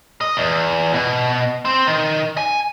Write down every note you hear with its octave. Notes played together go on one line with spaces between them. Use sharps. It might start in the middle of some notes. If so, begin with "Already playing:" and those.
D#5
E2
B2
C4
D#3
G#5